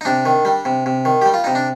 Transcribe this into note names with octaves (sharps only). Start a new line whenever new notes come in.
D#4
C3 D4
D#3
G3
C3
C3
D#3
G3 G4
F4
C3 D#4
D4